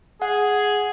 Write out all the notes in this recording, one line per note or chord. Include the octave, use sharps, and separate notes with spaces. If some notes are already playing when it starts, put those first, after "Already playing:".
G#4 F#5